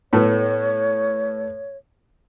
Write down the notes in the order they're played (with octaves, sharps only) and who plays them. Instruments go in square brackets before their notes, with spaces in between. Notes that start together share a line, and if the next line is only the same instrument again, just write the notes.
[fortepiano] A2 A3 B3 [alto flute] C#5